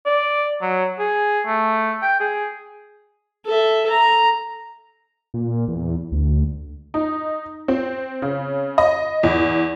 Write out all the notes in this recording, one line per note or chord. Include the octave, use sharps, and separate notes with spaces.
D5
F#3
G#4
A3
G5
G#4
A4 E5
A#5
A#2
E2
D2
D#4
C4
C#3
D#5
E2